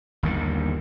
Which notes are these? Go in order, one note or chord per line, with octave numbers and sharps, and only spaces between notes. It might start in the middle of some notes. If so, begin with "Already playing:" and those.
G1 D#2 D#3